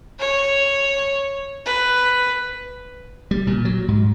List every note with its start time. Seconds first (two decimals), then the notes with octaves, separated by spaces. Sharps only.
0.19 C#5
1.66 B4
3.31 G3
3.47 A#2
3.65 F#3
3.88 G#2